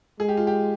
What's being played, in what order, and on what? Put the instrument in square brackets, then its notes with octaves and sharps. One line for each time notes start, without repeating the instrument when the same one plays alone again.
[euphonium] G#3 [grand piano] G#4
[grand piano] G4
F4
G4